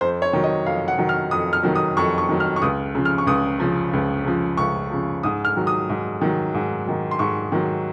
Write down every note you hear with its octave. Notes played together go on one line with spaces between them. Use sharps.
F2 C5
C#5
D#3 F#3
D#5
F2 F5
F#5
D#3 F#3
F6
F2 D#6
F6
D#3 F#3
D#6
F2 C#6
C#6
D#3 F#3
F6
C#6
C#2 D#6
C#3 F3
F6
C#6
C#2 D#6
C#3 F3
C#2
C#3 F3
C#2 C#6
C#3 F3
G#2 D#6
F6
D#3 F#3
D#6
G#2
D#3 F#3
G#2
D#3 F#3
C6
G#2 C#6
D#3 F#3